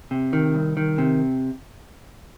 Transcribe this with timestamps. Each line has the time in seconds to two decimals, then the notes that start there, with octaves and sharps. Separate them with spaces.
0.11 C3
0.33 D#3
0.54 C2
0.77 D#3
0.98 C3